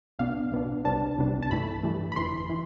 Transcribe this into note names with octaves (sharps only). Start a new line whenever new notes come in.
C2 B2 B3 D4 F5
C2 B2 B3 D4
C2 C3 G3 B3 D4 A5
C2 C3 G3 B3 D4
A5
G2 E3 A3 B5
G2 E3 A3
B5
G1 F2 E3 C6
E3